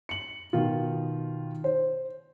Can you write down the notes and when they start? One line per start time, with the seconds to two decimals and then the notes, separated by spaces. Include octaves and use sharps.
0.09 C#7 F#7
0.53 B2 D#3 F4
1.64 C5